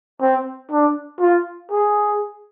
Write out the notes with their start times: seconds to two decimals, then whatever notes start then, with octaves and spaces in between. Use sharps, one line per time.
0.21 C4
0.71 D4
1.20 F4
1.72 G#4